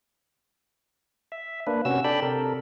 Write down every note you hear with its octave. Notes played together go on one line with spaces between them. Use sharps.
E5
A#3 D4 B4
C3 C#4 F#4 E6
D4 A4 D5 G5 B5
C3 A4 A#4